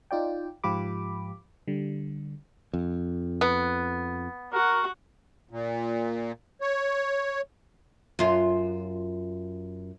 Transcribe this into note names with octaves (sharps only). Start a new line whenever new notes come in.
D#4 F4 D5 G5
G#2 F3 F4 G4 B5 D6
D3 G3
F2
B3
F#4 A#4 F#5
A#2
C#5
F#2 F4